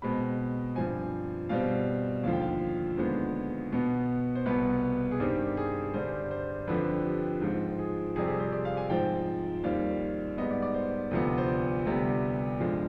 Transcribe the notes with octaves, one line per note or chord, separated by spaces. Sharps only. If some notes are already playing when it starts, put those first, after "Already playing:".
B2 G#3 C4 B5
G2 F3 C4 G#5
B2 G3 C4 F5
D#2 D3 F3 F5
G5
F5
D#2 D3 G#3 B3 C5
B2 B3
C5
C2 B2 B3 B4
G#4
G2 D#3 G3 C4 G4
G4
G#4
G2 D3 G3 C5
C5
F2 D3 F3 C4 B4
G4
G#2 F3 C4
G#4
F2 C3 G3 C4 G#4
G#4
C5
D5
F5
G#5
G#2 F3 C4 G5
D#2 D#3 G3 C4 F5
G#2 G3 B3 D#5
D5
D5
C5
D2 C3 F3 B3
C5
D5
D2 C3 G3 B3
G2 D3 F3 G#3